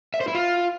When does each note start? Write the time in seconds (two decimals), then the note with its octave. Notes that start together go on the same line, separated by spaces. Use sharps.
0.14 E5
0.21 C5
0.28 E4
0.35 F4